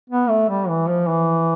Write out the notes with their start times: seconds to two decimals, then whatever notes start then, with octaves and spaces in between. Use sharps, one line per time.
0.10 B3
0.29 A3
0.49 G3
0.69 E3
0.89 F3
1.09 E3